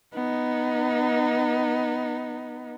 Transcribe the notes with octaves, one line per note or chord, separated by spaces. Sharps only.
B3 D#4